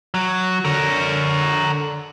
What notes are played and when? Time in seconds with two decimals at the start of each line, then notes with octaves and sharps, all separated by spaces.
0.14 F#3
0.65 D3 A#4 C#5